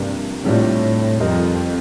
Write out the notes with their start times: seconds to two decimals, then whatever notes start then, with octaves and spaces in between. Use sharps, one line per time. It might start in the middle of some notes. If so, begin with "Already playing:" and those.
Already playing: G2 C3 F3 A#3 D4
0.44 A2 C3 G3 D4 F4
1.20 F2 G3 C4 G4 A#4 D#5